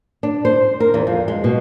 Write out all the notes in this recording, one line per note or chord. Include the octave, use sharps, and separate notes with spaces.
D4
C5
A#4
E2
F2
G#3
B2